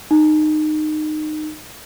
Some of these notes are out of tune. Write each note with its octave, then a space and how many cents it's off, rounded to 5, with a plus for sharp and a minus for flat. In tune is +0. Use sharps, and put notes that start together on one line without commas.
D#4 -20